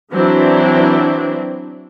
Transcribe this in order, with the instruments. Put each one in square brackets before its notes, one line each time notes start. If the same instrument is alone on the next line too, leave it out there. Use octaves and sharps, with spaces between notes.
[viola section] E3 F#3 C4 D4 E4